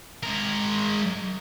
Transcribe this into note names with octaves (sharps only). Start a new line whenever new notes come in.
G#3 A#4